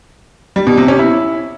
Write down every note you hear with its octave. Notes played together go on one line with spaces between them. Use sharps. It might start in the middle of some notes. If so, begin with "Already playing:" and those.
G3
B2
C3
C#4
E4